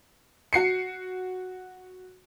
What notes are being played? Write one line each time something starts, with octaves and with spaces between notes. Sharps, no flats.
F#4 C7 C#7